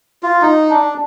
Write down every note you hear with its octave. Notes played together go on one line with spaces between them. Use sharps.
F4
D#4
D4